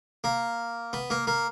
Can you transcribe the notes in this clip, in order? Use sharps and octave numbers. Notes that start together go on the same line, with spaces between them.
A#3
B3
A#3
A#3